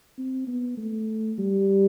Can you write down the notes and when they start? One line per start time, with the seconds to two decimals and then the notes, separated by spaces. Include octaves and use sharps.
0.18 C4
0.48 B3
0.78 A3
1.39 G3